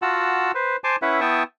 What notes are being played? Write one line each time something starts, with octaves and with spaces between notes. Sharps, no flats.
F4 F#4 F#5 A5 E6
B4 C5
C5 G#5 A5 C6 D6
C#4 E4 B4 E5 F#5
B3 E4 G5 A5 C#6 D#6